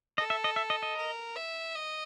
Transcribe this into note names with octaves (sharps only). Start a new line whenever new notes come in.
A4 D#5
E5
D#5
E5
D#5
D#5
A#4
E5
D#5